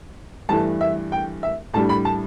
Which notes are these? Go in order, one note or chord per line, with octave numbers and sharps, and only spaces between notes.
G2 E3 A3 A5
E5
G5
E5
A2 G3 D4 A5
B5
A5